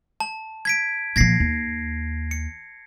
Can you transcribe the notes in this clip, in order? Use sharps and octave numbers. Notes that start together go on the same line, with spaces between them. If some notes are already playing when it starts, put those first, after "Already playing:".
A5
G#6 B6 D7
A#2 F3 G#6 A#6 C7
D#2
C#7